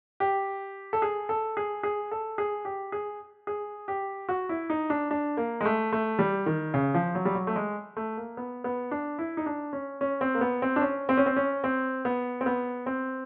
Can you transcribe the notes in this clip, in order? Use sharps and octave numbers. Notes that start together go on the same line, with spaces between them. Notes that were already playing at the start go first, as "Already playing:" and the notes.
G4
A4
G#4
A4
G#4
G#4
A4
G#4
G4
G#4
G#4
G4
F#4
E4
D#4
D4
D4
A#3
G#3
A3
A3
G3
D#3
C#3
F3
F#3
G3
F#3
A3
G#3
A3
A#3
B3
B3
D4
E4
D#4
D4
C#4
C#4
C4
A#3
B3
C4
D4
C#4
C4
C#4
C4
C#4
C4
B3
C4
B3
C4